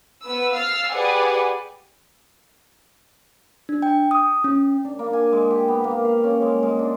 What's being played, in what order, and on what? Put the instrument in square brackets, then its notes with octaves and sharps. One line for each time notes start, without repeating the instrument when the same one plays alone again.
[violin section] B3 B4 E6
F5 E6 F6 A6 C7
G4 G#4 B4 D5 F#5 G#5
[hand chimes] D4
G5
D#6
C#4
[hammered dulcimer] D4
A#3
G#5
G#3
G4
B3
A#3
F5
C#4
G#3
G#3
D4